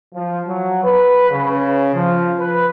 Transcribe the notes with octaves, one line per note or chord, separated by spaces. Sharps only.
F3
F#3
B4
C#3
F3
B4